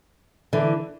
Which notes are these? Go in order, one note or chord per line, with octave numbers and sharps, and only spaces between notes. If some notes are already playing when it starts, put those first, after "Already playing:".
D3 E3